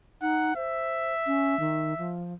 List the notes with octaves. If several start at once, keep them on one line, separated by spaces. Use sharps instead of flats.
D#4 F#5
C5 E5
C#4
D#3
F3